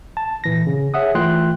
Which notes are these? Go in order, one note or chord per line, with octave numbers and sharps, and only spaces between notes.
A5
A#2 E3 A#6
C#3
G#4 C#5 E5 F#5 D#6
E3 A3 F4 G5 C6 F#6